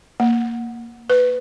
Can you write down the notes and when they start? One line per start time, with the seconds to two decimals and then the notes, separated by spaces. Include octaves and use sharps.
0.20 A#3
1.10 B4